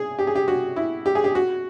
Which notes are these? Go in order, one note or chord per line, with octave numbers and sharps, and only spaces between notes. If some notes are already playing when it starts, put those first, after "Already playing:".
Already playing: G#4
G4
G#4
G4
F#4
E4
G4
G#4
G4
F#4